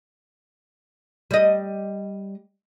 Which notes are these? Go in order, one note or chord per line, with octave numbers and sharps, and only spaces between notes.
G3 D#5